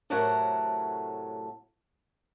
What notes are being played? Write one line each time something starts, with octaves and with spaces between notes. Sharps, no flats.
A2 C3 F#3 A3 A#4 F#5